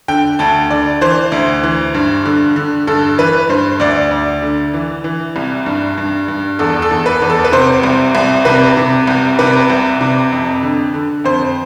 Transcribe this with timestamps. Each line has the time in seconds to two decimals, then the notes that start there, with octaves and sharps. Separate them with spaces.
0.08 D3 G5
0.39 D2 A5
0.70 D3 D5
1.01 E3 C5
1.32 D2
1.63 E3
1.95 G2
2.26 D3
2.56 D3
2.87 G2 A4
3.18 E3 B4
3.49 G2 C5
3.80 D2 D5
4.11 D2
4.42 D3
4.74 E3
5.04 E3
5.36 C2
5.66 G2
5.98 G2
6.28 G2
6.59 E2 A4
6.82 A4
6.91 E2
7.06 B4
7.22 E2
7.30 A4
7.44 B4
7.52 C3 C5
7.83 C2
8.15 C2
8.45 C3 B4
8.77 C3
9.07 C2
9.39 C3 B4
9.70 C2
10.01 C3
10.32 F2
10.63 D3
10.94 D3
11.24 F2 C5